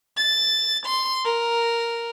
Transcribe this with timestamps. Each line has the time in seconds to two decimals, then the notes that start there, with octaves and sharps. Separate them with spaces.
0.17 A6
0.86 C6
1.24 A#4